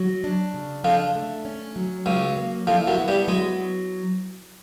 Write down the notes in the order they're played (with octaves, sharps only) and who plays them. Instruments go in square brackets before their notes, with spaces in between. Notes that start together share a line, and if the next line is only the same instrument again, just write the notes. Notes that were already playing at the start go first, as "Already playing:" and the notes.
Already playing: [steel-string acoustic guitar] F#3
D4
C#3
[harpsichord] F2 F3 [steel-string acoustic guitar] D4
[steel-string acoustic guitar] A3
C#4
F#3
[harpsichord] C#2 C#3 [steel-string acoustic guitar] F#3
[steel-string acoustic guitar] A#3
[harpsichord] F2 F3 [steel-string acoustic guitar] E4
[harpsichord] F#2 F#3
[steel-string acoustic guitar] B3
[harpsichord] G2 G3
[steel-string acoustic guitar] F#3 [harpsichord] G#3